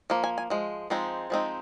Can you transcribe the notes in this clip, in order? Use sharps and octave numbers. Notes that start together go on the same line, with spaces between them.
F3 A#3
G#5
G#5
F3 G#3
F3 G#3 C4 D#4
F3 G#3 C4 D#4